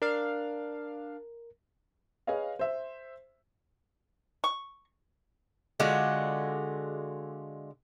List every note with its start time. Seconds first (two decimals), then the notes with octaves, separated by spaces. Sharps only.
0.02 D4 A#4 F5
2.27 G#4 B4 C#5 D#5 F5
2.59 C5 E5
4.44 C#6
5.80 D3 G#3 F4 F#4